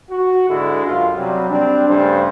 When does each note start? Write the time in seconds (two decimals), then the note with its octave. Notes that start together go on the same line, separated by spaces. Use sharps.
0.11 F#4
0.49 G#2 D3 G#3 E4 A4
0.86 F#2 F4
1.15 C3 F#3 G3
1.49 G3 C4 D4
1.88 G2 C#3 G3 A3 C5